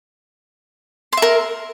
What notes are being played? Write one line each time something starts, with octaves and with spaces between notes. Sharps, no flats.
A#4 E5 C6